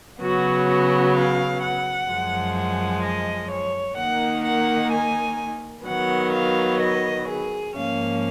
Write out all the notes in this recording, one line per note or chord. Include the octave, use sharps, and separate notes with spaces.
C#3 F#3 B3 F#4
F#4
F5
F#5
F#2 F3 G#3
F#5
D#5
C#5
D#3 A#3 D#4 F#5
F#5
G#5
D#3 F#3 B3 F#5
F5
D#5
G#4
G#2 F3 A#3 C#4 F5